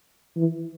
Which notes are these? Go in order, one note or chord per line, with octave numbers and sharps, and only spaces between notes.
E3